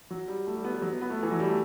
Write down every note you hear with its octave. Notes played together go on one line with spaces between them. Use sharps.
F#3
G3
A3
G3
B3
G3
F#3
B3
B3
A3
E3
F#3
G3
A3